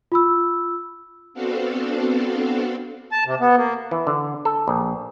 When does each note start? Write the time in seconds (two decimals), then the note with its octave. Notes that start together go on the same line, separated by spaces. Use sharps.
0.12 F4 B5 E6
1.34 B3 C4 D4 F#4 A4 F5
3.12 A5
3.26 C3
3.40 B3
3.57 A#3
3.91 E3
4.07 D3
4.45 A4
4.68 A#1